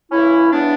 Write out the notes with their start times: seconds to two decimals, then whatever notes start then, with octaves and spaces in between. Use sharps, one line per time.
0.11 C#2 C#3 E3 C#4 E4
0.51 E2 C#3 E3 B3 D4